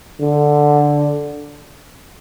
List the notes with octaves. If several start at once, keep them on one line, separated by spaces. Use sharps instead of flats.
D3